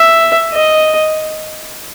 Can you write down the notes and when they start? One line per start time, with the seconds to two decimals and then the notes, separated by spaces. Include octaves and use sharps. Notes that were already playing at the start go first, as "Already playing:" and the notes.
Already playing: E5
0.53 D#5